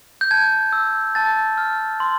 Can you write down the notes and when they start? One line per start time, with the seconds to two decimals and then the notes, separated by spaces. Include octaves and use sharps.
0.21 G6
0.31 A5 G#6
0.73 E6
1.15 A5 A6
1.58 F6
2.00 C6